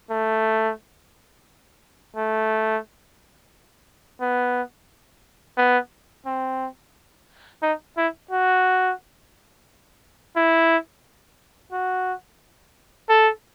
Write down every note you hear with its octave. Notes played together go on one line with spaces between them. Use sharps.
A3
A3
B3
B3
C4
D#4
E4
F#4
E4
F#4
A4